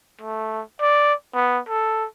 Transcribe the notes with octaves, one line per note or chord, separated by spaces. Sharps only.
A3
D5
B3
A4